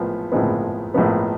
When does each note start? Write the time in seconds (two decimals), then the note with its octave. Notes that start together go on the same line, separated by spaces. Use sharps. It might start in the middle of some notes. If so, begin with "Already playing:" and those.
Already playing: A#1 A2 F3 G#3 B3
0.32 A#1 A2 F3 G#3 B3
0.94 A#1 A2 F3 G#3 B3